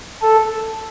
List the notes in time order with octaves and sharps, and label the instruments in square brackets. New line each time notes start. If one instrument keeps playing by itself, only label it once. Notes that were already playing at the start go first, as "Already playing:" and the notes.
[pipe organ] A4